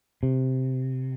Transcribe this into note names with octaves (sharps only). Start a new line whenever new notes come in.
C3